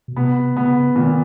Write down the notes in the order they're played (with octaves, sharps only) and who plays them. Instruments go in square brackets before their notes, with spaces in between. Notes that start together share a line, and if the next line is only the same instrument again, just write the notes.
[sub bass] B2
[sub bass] C3 [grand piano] B3
[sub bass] C#3 [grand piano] B3
[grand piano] A#2 [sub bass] D#3